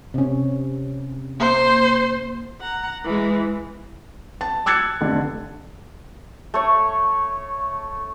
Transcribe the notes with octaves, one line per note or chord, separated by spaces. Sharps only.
C3 C#4
A#3 C5
F#5 A#5
E3 G#3
A5
D6 E6 F#6 G#6 A6 C#7
F1 D3
A3 C#5